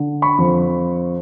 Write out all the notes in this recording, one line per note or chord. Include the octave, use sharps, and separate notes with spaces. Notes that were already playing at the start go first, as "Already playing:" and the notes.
Already playing: D3
B5 C#6
F2